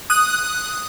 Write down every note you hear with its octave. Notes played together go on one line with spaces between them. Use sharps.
D#6 F#6